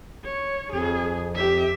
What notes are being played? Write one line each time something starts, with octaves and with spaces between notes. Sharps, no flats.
C#5
F2 G#4
G4 E5